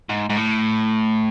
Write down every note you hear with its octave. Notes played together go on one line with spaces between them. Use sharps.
G#2
G#2
A2